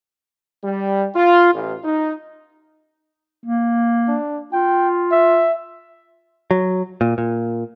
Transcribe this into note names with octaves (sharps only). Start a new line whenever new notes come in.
G3
F4
A1
D#4
A#3
D4
F4 G5
E5
F#3
A#2
A#2